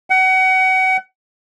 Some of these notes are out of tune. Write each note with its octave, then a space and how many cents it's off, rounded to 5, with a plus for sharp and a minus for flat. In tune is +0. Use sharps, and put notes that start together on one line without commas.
F#5 +30